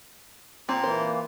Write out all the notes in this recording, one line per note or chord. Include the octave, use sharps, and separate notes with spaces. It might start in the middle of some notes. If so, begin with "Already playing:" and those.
A#2 C4
E3 A#3 C5